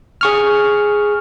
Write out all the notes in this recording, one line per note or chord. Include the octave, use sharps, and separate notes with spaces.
G#4 C#6 F6